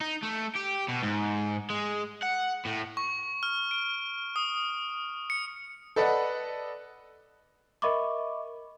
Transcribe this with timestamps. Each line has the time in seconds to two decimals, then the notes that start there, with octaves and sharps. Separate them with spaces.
0.01 D#4
0.23 A3
0.56 G4
0.88 B2
1.03 G#2
1.70 G#3
2.22 F#5
2.65 A2
2.97 C#6
3.43 F6
3.71 D7
4.36 D#6
5.30 C#7
5.96 A4 B4 D5 D#5 F#5
7.82 A#4 D#5 E5 B5 C#6 D6